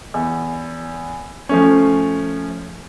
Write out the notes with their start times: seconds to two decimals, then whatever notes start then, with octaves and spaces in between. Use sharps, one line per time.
0.14 E2
1.49 F3 A3 C#4